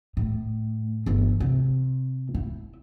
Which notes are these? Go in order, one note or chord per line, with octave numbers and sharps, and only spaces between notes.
A2
G1 E3
C3
E4